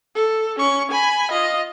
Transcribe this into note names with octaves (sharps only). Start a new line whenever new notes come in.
A4
C#4 C#6
G#5 B5
F4 D#5